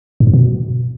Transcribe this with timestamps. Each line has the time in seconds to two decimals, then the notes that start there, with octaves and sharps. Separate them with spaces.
0.20 G#2
0.27 F#2
0.33 B2